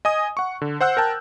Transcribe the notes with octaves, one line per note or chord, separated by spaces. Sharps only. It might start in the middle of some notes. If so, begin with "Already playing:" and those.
D#5 G#5 D#6
F#5 C#6
D3
C5 F#5 E6 F#6 G6
A#4 G5 A5